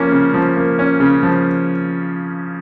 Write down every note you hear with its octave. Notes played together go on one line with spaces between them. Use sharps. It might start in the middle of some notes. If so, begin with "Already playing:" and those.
Already playing: F3 A#3 C#4
C#3
F3
A#3
C#4
C#3
F3